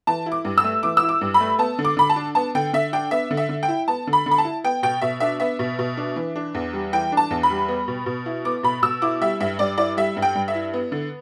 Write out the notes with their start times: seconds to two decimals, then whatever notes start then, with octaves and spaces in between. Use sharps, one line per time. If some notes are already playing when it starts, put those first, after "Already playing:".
0.07 E3 A5
0.26 E4
0.32 D6
0.45 G2
0.58 E6
0.64 A3
0.83 E3 D6
0.97 E6
1.02 E4
1.09 D6
1.21 G2
1.34 B5
1.40 A3
1.59 B3 A5
1.79 D3
1.85 D6
1.97 D3 B5
2.09 A5
2.16 D4
2.35 B3 A5
2.55 D3 G5
2.73 D3 E5
2.93 D4 G5
3.11 B3 E5
3.31 D3
3.37 E5
3.49 D3
3.63 G5
3.68 E4
3.88 B3 A5
4.07 D3
4.13 B5
4.26 D3
4.31 B5
4.38 A5
4.45 E4
4.64 B3 G5
4.83 B2 G5
5.02 B2 E5
5.20 D4 E5
5.40 B3 E5
5.59 B2
5.79 B2
5.97 D4
6.16 E3
6.36 D4
6.54 E2
6.73 G3
6.93 E3 G5
7.12 D4
7.17 A5
7.31 E2
7.43 B5
7.50 G3
7.68 B3
7.88 B2
8.06 B2
8.26 E4
8.45 B3 D6
8.63 B2 B5
8.82 B2 E6
9.02 E4 D6
9.21 G3 E5
9.40 G2 E5
9.59 G2 D5
9.78 E4 D5
9.97 G3 E5
10.17 G2
10.22 G5
10.35 G2
10.48 E5
10.55 E4
10.74 B3
10.92 D3